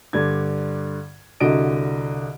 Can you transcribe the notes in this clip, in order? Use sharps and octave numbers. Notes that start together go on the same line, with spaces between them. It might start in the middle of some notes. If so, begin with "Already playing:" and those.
G2 D3 D5 G#6
C2 D3 F#4 D#5 D7